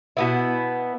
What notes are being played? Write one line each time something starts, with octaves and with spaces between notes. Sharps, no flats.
B2 B3 E4